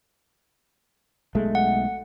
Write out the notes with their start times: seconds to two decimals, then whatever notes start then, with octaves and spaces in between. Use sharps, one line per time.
1.35 B1 G#3 A3
1.55 F#5